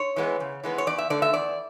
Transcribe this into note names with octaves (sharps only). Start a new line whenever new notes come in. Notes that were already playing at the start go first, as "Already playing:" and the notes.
Already playing: C#5
E3 G#3 B3
C#3
E3 G#3 B3
C#5
E2 D5
E5
D3 A3 D5
E5
E2 D5